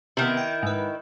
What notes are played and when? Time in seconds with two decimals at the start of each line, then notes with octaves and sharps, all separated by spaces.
0.17 C3 D#3 B3 E4
0.37 G5
0.63 G#2 B4